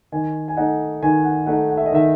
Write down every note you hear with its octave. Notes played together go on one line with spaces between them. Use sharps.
D#3 G#5
G#5
A3 D#4 F#5
D#3 G#5
F#5
A3 D#4 F#5
F#5
E5
D#5
D#3 E5